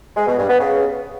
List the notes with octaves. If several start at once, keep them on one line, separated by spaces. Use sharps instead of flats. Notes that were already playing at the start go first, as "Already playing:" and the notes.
G#3
B2
G2
B3
C#3